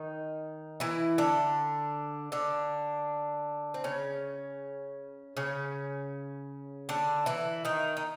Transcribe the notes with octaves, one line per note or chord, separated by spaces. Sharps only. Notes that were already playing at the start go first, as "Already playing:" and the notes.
Already playing: D#3 D#4
E3 E4
D3 D4
D3 D4
C4
C#3 C#4
C#3 C#4
D3 D4
E3 E4
D#3 D#4
D#4